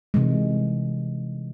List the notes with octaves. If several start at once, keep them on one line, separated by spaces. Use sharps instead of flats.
C3 E3 G#3